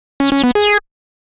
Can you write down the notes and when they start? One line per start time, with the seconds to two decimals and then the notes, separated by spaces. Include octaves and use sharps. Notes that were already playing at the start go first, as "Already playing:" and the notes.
0.20 C#4
0.32 C#4
0.44 B3
0.55 G#4